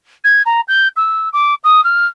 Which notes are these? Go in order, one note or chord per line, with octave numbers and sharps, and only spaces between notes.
G#6
A#5
G6
E6
D6
D#6
F6